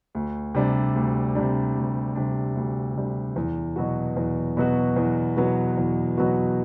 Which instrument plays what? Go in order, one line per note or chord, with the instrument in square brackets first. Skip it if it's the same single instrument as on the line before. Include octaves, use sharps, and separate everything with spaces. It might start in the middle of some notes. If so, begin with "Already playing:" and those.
[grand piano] D2
C3 G3 D4
D2
C3 G3 D4
D2
C3 G3 D4
D2
C3 G3 D4
E2
B2 F#3 B3 F#4
E2
B2 F#3 B3 F#4
E2
B2 F#3 B3 F#4
E2
B2 F#3 B3 F#4